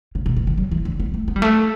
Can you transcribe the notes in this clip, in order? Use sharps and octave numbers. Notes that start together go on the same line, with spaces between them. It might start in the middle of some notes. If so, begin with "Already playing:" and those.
C#3
B2
B2
D3
F#3
E3
D3
B3
A3
B3
G3
A3